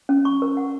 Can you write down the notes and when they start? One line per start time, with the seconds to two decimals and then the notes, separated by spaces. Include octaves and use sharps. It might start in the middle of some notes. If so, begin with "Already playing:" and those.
0.09 C#4
0.25 C#6
0.42 A#4
0.57 F#5